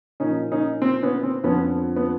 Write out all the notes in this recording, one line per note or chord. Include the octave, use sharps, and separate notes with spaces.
A#2 F3 C#4 D#4
C#4 D#4
C4
B3 C#4
C4
F2 D3 F3 B3 C#4
B3